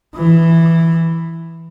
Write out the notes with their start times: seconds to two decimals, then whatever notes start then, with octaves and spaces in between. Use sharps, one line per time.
0.16 E3